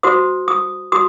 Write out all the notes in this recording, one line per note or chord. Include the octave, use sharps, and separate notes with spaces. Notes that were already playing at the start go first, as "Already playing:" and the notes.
F#4 C5 D#6
D#6
F#4 D#6